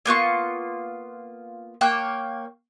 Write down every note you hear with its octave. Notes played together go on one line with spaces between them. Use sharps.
A#3 B3 F4 C#6
A#3 C#5 G5 F#6